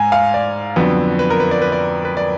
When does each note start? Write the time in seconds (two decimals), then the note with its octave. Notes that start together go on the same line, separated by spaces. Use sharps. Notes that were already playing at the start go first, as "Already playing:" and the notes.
Already playing: G#2 G#5
0.12 F5
0.34 D5
0.76 F2 D3 F#3 B3
1.19 B4
1.30 A#4
1.40 B4
1.51 D5
1.62 B4
1.72 D5
2.05 B4
2.17 D5